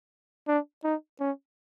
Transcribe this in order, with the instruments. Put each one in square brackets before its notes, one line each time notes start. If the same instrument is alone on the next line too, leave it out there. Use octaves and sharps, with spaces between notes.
[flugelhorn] D4
D#4
C#4